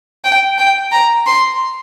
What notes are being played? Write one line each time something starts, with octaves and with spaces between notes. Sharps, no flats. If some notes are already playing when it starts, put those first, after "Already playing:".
G5
G5
A#5
C6